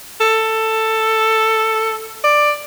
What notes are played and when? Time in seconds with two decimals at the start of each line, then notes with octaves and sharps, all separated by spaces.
0.21 A4
2.24 D5